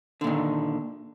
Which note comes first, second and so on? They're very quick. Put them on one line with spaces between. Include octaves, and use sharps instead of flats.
D3 A#2 D#3